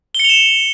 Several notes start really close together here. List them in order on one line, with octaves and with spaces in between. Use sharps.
G7 C#7 F7 E7